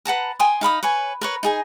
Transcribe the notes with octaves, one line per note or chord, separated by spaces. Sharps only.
B4 F#5 A5 A#5
G5 G#5 C6 D#6
D#4 F5 B5 D#6
B4 C#5 G#5
A#4 B4 C#5
D#4 G#4 G#5